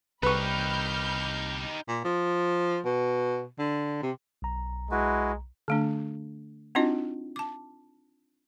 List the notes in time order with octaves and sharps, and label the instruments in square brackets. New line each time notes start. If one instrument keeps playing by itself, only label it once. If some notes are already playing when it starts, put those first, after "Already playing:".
[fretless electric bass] C2 [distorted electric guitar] D#4 G4 [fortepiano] B4 C#6 [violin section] B5 F6 G6
[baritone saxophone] A#2
F3
B2
D3
C3
[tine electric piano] B1 A#5
[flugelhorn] G#3 [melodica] E4 F#4 B4
[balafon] D3 A3 D4
C4 D4 D#4 F4 F#4 D#5
A5 D6